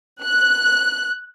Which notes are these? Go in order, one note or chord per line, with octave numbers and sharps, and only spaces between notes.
F#6